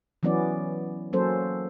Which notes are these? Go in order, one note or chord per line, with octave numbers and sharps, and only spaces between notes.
E3 F#3 B3 C#4 D5
F#3 A#3 C#4 A4 C5